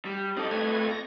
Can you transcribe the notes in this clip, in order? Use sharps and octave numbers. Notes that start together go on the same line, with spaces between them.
G3
C4 D#4 A4 D5 D#5
A3 B4 G#6
A#6